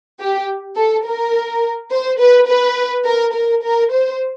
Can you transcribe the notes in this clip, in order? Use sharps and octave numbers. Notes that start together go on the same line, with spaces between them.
G4
A4
A#4
C5
B4
B4
A#4
A#4
A#4
C5